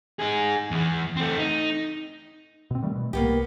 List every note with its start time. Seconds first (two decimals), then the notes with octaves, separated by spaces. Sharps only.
0.19 D#4 G#4
0.71 E2 E3
1.16 A3 C4
1.38 D#4
2.71 B2 C4
2.82 D#3 G3 A3
2.96 B2
3.13 C2 A#3 B3 G4